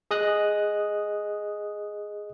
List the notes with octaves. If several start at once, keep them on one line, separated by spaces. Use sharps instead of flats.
G#4 D#5 D#6 F#6